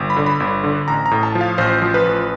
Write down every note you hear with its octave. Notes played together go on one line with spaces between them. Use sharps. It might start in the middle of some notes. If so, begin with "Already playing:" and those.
Already playing: G1
B5
D3
B5
G1
D3
A1 A#5
A#5
A2
A5
F3
F5
A1 C5
F3
B4
A1